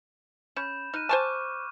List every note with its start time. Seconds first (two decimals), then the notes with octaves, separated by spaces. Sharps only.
0.56 C#4 B5 G6 E7
0.94 D#4 F6 F#6 D#7
1.09 C5 G#5 A5 C#6 D6 F6